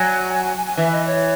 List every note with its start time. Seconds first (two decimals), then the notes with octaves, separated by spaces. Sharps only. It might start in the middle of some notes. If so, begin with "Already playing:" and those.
Already playing: F#3 G#5
0.33 G#5
0.45 G#5
0.56 G#5
0.66 G#5
0.77 E3 E5
0.92 D#5
1.07 C#5